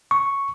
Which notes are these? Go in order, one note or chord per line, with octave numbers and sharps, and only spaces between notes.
C#6